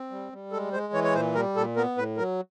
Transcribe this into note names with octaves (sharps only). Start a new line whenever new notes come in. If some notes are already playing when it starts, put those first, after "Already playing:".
Already playing: C4
G3
G3
G#3 A4
G#3 C5
E3 C#5
C#5
A#2 C5
G3 A#4
A#2 A4
B3 A#4
A2 B4
F#3 A#4